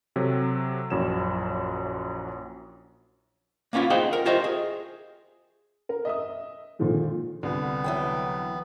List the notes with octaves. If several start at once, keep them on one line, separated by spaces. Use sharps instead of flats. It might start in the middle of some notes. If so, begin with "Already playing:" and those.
C3 F#3 A4
A#1 F#2 F#3 E4 E7
A#3 B3 C#4 E4 F4
B3 D#4 F4 G#4 C5 G5
A#4
F4 G4 C5 C#5 D#5 E5
G#4
A#4
D#5 E5 D#6
A#1 A#2 D3 D#3 F3 G#3
C2 D3 B3
E3 F#3 G5